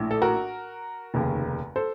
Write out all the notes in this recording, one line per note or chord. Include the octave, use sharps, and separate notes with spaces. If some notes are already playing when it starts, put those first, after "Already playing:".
Already playing: A#1 A2
A4
F#4 A#4
F1 D#2 C#3
A4 C5